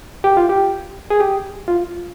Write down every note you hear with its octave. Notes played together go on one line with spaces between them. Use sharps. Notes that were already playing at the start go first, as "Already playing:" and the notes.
G4
F4
G4
G#4
G4
F4